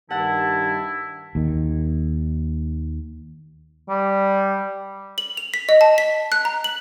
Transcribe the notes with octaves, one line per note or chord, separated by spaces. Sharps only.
G2 D#3 E4 F#5 A5
D#2 D#3
G3
F#7
F7
B6
D#5
A5
B6
F#6
A#5
F#7